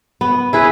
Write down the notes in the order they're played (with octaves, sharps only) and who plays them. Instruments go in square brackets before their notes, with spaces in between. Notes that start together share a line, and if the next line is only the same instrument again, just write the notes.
[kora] B3
E4 G#4 B4